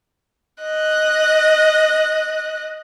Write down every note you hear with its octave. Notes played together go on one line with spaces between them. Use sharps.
D#5 F#6